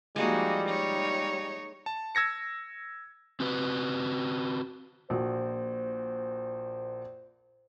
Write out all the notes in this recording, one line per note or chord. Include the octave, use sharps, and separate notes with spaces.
F3 G3 G#3 A#3 D#4 F#4 D#5
D#4 C#5
A5
E6 G#6 A#6 C#7
C4 F#4 B4
A#1 A#2 F#4 C5